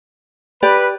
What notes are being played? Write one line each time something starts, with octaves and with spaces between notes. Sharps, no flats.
G4 B4 D5